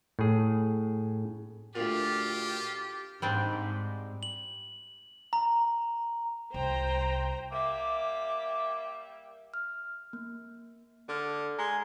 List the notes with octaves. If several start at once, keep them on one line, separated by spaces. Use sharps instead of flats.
A2 G#4
D2 A#2 F4 G4
G#2 G3 C4 D4
F#7
A#5
C2 C5 G5 A#5
G3 A#3 E5 D6
F6
A#3
D3 A4 F6
G#3 A#5